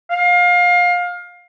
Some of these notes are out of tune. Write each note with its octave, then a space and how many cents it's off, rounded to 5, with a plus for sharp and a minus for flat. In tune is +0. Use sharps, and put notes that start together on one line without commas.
F5 +25